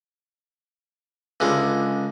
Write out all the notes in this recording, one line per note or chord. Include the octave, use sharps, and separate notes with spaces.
C#2 D3 G#3